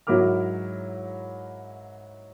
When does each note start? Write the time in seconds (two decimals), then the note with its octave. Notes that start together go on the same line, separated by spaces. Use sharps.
0.07 G#2 F#3 E4 A#4 D6 F6